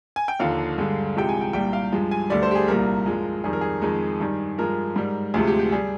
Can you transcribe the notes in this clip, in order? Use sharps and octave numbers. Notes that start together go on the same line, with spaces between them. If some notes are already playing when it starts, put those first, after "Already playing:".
G#5
G5
D#2 D3 F3 F5
G2 D3 G#3
C2 C3 F3 G#3 G5
G#5
G5
C2 A#2 G3 G5
F5
G2 F3 G#3
G#5
D2 D3 G3 D5
C5
G4
G#4
C2 A#2 G3 A#4
G2 F3 G#3
F2 D#3 G3 G#4
A#4
G#4
F2 D#3 G#3
G2 D#3 G3
G2 F3 G#3 A#4
G#2 G3
D2 C3 F3 G#3 G#4
G4
G4
G3 G#4